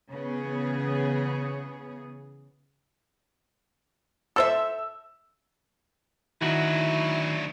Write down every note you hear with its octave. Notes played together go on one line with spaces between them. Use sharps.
C#3 E3 B3 G#4
A4 C5 E5 E6
D2 D#3 F#3 E4 F#4